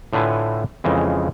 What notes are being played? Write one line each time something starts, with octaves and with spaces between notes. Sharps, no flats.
A2 D3 A3 F4 B4 G#5
F2 C#3 E3 G#3